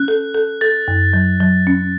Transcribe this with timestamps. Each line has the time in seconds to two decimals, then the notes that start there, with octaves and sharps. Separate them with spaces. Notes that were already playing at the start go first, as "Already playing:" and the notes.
Already playing: C#4 F#6
0.08 A4
0.34 A4
0.61 A4 A6
0.88 F#2
1.13 F#3
1.40 F#3
1.67 C#4